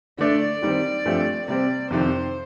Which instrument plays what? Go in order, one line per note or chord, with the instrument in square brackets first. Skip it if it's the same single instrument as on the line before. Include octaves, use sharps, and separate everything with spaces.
[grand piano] D3 A3 D4 [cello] D5
[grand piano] D#3 G3 C4
G2 F3 A3 C4 G4
[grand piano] C3 G3 C4 [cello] D5
[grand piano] F2 C3 D#3 [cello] C5